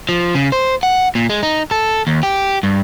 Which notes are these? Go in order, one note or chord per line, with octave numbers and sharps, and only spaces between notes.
F3
C#3
C5
F#5
A#2
G#3
D#4
A4
D#2
G4
G2